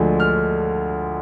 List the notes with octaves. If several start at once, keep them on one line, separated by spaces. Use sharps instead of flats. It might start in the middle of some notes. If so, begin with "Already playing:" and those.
Already playing: D2 D3 F3 G#3
F6